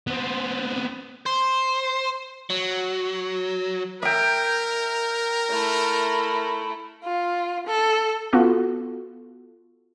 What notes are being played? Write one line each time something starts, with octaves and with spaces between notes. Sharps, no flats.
B3 C4
C5
F#3
A#4 E5 G5
A3 E4
F4
A4
B3 F4 F#4 A4